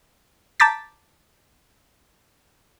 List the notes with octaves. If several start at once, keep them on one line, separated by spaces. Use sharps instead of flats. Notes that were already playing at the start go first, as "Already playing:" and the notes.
A5 A#5 D6 G6 A6 B6